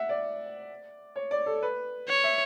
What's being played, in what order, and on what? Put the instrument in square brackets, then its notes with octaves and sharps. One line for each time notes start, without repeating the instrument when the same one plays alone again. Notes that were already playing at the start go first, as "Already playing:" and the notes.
Already playing: [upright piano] E5 F#5
D5
C#5
D5
A4
B4
[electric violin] C#5
[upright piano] E5